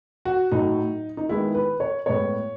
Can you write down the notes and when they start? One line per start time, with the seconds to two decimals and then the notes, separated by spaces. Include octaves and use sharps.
0.25 F#4
0.52 A2 F#3 A3 D#4
1.17 D#4
1.29 D#3 G#3 B3 E4
1.55 B4
1.80 C#5
2.06 A2 G#3 B3 C#5